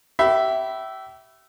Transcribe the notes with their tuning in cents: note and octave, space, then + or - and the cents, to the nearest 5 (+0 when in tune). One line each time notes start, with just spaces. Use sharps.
G4 -35 E5 +0 B5 +0